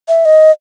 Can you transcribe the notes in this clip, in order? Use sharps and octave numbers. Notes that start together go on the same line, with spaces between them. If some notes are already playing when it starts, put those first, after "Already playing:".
E5
D#5